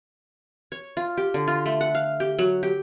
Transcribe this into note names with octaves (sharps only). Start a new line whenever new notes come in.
C#5
F4
G4
D3
F4
A3
F#5
F5
G4
F#3
G4